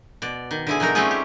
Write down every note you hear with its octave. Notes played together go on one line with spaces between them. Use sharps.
B2 D5
D#3
D3 E4 G#4
B2 F#3 D#4 A#4
G3 A3 C4 C#4 F4 G#4
G4